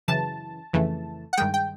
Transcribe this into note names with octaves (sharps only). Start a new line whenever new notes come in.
F#2 C#3 E3 A5
F2 C#3 E3 A3
F#5
G2 D#3 G#3 G5
G5